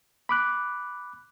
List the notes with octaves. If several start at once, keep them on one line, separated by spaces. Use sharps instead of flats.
B5 D6 F#6